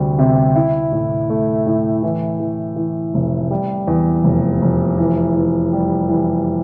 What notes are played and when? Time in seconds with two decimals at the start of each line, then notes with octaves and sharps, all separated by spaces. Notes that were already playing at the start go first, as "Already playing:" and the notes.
Already playing: D2 C3 G3
0.19 C3
0.55 E4
0.92 A2
1.30 A3
1.67 A2
2.03 E3
2.40 E3
2.76 E3
3.14 F1
3.51 G3
3.87 E2
4.24 F1
4.62 F1
4.98 E3
5.35 E3
5.73 G3
6.09 E3